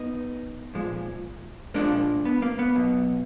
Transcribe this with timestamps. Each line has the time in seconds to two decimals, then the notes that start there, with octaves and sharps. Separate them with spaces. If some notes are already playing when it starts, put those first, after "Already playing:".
Already playing: B3 D#4
0.74 A#2 F3 G#3
1.74 A#2 F3 G#3 A#3 D4
2.25 B3
2.42 A#3
2.59 B3
2.75 B2 F#3